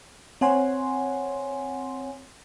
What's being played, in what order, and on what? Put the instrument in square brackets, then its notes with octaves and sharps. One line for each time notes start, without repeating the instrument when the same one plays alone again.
[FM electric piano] C4 C#5 F#5 G#5 C6